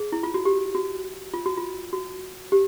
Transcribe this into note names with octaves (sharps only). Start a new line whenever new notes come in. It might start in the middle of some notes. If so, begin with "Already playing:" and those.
Already playing: G#4
E4
F4
F#4
G4
F#4
F4
F#4
F4
F#4
G4